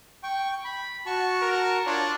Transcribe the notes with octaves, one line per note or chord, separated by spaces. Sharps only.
G5 C#6
B5
F#4 A5 C#6
A#4
D4 F4 C#5